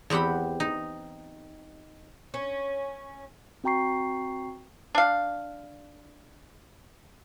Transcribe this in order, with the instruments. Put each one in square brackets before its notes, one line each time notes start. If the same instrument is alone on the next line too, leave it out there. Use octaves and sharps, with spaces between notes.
[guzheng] E2 C4 G4 F#5 B5
D#4
[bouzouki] C#4
[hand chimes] C4 F#4 G5 A#5 C#6 C7
[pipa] D4 F5